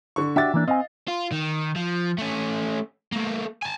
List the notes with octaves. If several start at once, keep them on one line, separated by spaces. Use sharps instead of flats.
D3 C#6
D4 F#4 G4 E5 A6
E3 A#3 D4
C4 D#5 F5 G#5
F4
D#3
F3
A3 C#4
A3 A#3
G#5 A5